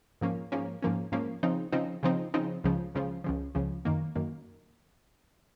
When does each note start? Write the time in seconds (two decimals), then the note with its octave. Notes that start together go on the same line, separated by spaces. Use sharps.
0.21 G#2 F3 A#3 C#4
0.52 G#2 F3 A#3 C#4
0.82 G#2 F3 A#3 C#4
1.12 G#2 F3 A#3 C#4
1.43 C#3 F3 C4 D#4
1.72 C#3 F3 C4 D#4
2.03 C#3 F3 C4 D#4
2.34 C#3 F3 C4 D#4
2.64 C#2 C#3 F3
2.95 C#2 C#3 F3
3.24 C#2 C#3 F3
3.55 C#2 C#3 F3
3.85 F#2 D#3 A#3
4.16 F#2 D#3 A#3